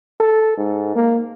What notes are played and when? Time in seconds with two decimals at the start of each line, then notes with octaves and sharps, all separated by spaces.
0.20 A4
0.58 G#2
0.96 A#3